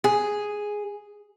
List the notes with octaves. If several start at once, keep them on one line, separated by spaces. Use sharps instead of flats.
G#4